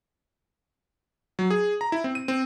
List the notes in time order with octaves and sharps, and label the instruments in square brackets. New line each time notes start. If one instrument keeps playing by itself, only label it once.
[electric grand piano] F#3
G#4
A#5
E4
C4
D#7
C4